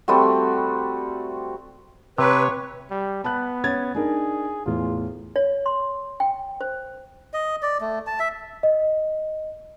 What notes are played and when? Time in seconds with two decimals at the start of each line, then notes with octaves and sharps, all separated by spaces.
0.08 G3 A3 C4 F#4
2.18 C3 B4 C#5
2.91 G3
3.24 B3 A5 B5 F#6
3.64 C#4 G#6 A6
3.95 D4 D#4 G#4 A#4
4.66 E2 A2 F4
5.36 C#5
5.66 C6
6.20 G5
6.61 C5
7.34 D#5
7.63 D5
7.81 A3
8.07 A5
8.20 E5
8.63 D#5